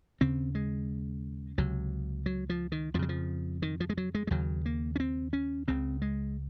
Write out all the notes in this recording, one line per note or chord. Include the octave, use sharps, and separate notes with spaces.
D#2 C#3 C4
G#3
C#2 C3 F#3
F#3
F3
D#3
F2 C#3 F3 F#3
F3
D#3
F3
G#3
F#3
G#3
G#3
D#2 C#3 F#3
A#3
C#4
C4
C#4
C#2 C#3 C4
G#3